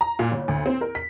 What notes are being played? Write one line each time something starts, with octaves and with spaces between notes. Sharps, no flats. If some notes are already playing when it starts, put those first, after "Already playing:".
A#5
A#2
G1
D2
C4
A#4
B6